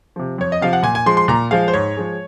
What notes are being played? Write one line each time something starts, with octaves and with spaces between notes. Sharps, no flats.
C3 F3
F2 C#5
D#5
C3 F3 F5
F#5
A#2 G#5
G#5
F3 G#3 C6
C6
A#2 A#5
F3 G#3 F5
C5
G#2 C#5
F3 G#3